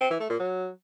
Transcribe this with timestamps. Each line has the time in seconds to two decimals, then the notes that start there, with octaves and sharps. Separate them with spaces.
0.01 C4
0.10 E3
0.20 A3
0.30 A#2
0.39 F#3